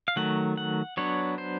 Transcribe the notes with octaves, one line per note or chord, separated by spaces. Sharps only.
F5
D#3 F#3 A3 F#5
F#5
F#3 B3 D4 C#5
C5